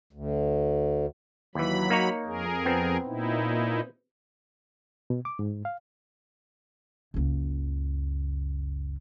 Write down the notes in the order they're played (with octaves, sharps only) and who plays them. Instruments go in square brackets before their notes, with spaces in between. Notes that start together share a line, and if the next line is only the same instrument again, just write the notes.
[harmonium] D2
[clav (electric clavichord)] D#2 E3 [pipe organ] F#3 B5
[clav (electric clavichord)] A#3 D#4 C#5
[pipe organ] F2 G#4 A#4
[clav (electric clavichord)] B3 C4
[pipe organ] A#2 D#4 E4
[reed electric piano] B2
D6
G#2
F5
[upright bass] F#1 C#2